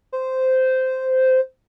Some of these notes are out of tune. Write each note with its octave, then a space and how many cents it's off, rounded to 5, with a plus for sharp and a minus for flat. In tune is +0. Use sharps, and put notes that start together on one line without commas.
C5 -10